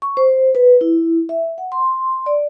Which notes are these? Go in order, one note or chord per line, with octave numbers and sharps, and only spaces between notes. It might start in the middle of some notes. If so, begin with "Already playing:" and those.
C#6
C5
B4
E4
E5
F#5
C6
D5